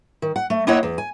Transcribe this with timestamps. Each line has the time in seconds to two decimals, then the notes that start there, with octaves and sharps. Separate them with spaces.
0.22 D#3
0.36 F#5
0.50 A3
0.67 A#3 C4 E4 C#5 D#5 F#5
0.83 E2
0.98 G#5